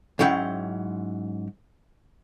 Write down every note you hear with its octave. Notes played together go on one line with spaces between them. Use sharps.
G#2 F#3 C#4 E4 G5